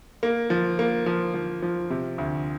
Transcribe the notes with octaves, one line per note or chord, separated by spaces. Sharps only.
A#3
F3
A#3
F3
F3
F3
C3
D2